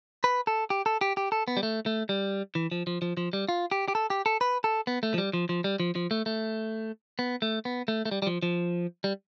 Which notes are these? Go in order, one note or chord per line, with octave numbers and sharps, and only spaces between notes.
B4
A4
G4
A4
G4
G4
A4
B3
G3
A3
A3
G3
E3
F3
F3
F3
F3
G3
F4
G4
G4
A4
G4
A4
B4
A4
B3
A3
F3
G3
F3
F3
G3
F3
F3
A3
A3
B3
A3
B3
A3
A3
G3
G3
F3
F3
G3